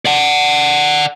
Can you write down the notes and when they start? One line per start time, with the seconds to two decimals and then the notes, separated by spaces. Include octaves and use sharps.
0.05 D5 F#5